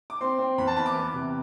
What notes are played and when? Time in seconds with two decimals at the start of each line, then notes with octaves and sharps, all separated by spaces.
0.10 D6
0.21 C4 C6
0.39 C4
0.58 E2 B5
0.67 A5
0.76 E3 B5
0.86 D6
0.95 B3
1.14 C3